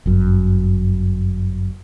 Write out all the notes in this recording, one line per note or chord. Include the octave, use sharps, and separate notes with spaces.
G1 F#2